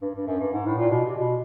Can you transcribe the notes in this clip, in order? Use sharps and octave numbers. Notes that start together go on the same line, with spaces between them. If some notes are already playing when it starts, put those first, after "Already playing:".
G2
G2
F#2
G2
G#2
A2
A#2
B2
C3
B2